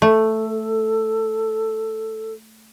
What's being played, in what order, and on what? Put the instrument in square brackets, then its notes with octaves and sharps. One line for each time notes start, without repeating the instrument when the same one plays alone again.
[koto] A3 [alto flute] A4